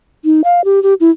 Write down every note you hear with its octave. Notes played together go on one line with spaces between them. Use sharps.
D#4
F5
G4
G4
E4